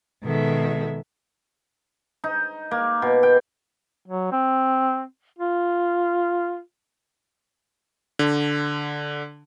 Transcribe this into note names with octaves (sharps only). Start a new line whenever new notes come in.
B2 D#3 G#3 A4 E5
D#4
A#3
B2
G5
F#3
C4
F4
D3